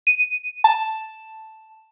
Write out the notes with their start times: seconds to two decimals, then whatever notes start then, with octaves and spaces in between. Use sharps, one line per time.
0.07 D#7
0.64 A5